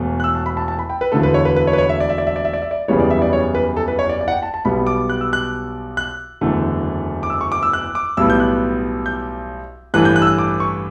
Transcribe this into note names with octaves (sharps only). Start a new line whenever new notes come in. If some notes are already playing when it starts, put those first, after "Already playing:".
Already playing: E1 E2 B2 A3
F#6
E6
A5
B5
A5
A5
B5
G5
B4
E1 D2 D3 A3 A4
B4
C#5
B4
B4
C#5
B4
C#5
E5
D5
E5
D5
E5
D5
E5
D5
E5
D5
F#1 E2 C#3 G3 B3 C#5
D5
E5
D5
C#5
B4
A4
B4
C#5
D5
D5
F#5
G5
A5
A5
B1 B2 G3 B3 B5
D6
F#6
E6
F#6
F#6
F#1 E2 D3 A3
D6
E6
C#6
D6
E6
F#6
D6
B1 A2 G3 B3 E6
G6
F#6
G6
A1 G2 E3 A3 F#6
G6
F#6
E6
F#6
D6
C#6